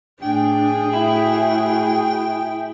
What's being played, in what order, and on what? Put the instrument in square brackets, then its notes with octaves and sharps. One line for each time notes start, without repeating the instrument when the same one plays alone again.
[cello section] A2 G#4 [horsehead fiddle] D4 [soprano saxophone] G5
[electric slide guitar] E4 [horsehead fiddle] F#4